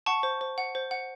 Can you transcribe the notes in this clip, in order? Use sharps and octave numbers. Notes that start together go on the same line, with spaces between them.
F#5 A5 C#6
C5
C5
F#5
C5
F#5